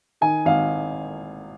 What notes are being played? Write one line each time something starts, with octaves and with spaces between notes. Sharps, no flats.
D#3 G#5
G#1 F5